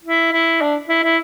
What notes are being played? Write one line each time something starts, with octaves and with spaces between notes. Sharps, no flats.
E4
E4
D4
E4
E4